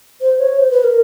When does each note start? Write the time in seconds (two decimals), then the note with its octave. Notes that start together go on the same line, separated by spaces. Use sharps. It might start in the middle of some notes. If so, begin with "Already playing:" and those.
0.21 C5
0.40 C#5
0.59 C5
0.71 B4
0.84 A#4